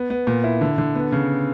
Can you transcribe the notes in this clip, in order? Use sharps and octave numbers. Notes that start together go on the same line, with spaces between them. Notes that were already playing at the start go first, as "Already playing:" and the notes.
Already playing: B3
B3
A#2
E4
D3
D3
B3
C#3